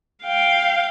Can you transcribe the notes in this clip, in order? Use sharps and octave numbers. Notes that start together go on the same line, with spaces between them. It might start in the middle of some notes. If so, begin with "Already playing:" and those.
F5 G5